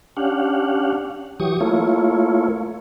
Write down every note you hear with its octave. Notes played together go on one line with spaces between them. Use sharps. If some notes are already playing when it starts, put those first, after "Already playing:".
C#4 D4 G4 F5 F#5
E3 F#3 G4 C#6 D#6
A3 A#3 E4 F4 C#5